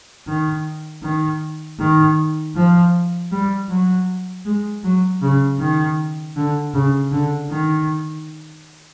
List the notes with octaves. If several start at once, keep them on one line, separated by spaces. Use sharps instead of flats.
D#3
D#3
D#3
F3
G3
F#3
G#3
F#3
C#3
D#3
D3
C#3
D3
D#3